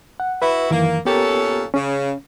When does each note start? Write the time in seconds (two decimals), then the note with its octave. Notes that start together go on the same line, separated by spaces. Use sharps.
0.20 F#5
0.42 E4 F#4 B4 E5
0.70 F#2 D#3 E3 A#3
1.05 A#2 B3 C#4 G4 A4 A#4
1.74 C#3 C#4